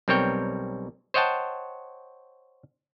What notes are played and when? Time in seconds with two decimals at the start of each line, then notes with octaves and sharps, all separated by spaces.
0.08 B1 G3 C4 A#4 C#5 G5
1.14 C5 C#5 D#5 F#5 G5 A5